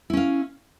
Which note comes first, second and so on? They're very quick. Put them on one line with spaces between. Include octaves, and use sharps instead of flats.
E4 C#4 F5